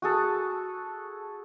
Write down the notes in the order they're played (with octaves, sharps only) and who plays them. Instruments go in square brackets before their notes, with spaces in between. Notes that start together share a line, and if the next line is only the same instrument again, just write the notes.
[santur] F#4 G#4 A4